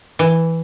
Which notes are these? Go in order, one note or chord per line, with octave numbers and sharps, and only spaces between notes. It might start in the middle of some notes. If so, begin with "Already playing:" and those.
E3